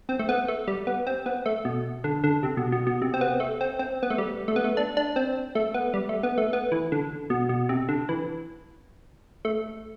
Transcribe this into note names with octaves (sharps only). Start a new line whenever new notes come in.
C4
A3
B3
A3
G3
B3
C4
B3
A3
B2
D3
D3
C3
B2
B2
B2
C3
C4
B3
A3
C4
C4
B3
A3
G3
A3
B3
A3
D4
D4
C4
A3
B3
G3
A3
B3
A3
B3
E3
D3
B2
B2
C3
D3
E3
A3